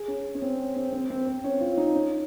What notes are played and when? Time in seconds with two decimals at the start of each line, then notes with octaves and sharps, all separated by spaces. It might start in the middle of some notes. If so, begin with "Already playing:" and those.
Already playing: G#4
0.08 C#4
0.35 C#4
0.42 C4
0.76 C4
0.93 C4
1.10 C4
1.26 C4
1.44 C#4
1.61 F4
1.77 D#4
1.95 C#4